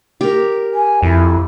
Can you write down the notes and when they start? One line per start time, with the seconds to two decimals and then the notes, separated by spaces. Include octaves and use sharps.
0.21 G4 A#4
0.73 G#5
1.03 F2 E4